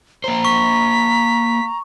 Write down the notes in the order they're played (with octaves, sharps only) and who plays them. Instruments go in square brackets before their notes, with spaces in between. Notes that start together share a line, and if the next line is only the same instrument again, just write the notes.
[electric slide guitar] A#3 C5 [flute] A#5
[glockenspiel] C#6 [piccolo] B6